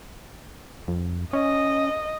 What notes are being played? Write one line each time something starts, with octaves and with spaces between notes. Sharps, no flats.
F2
C#4 D#5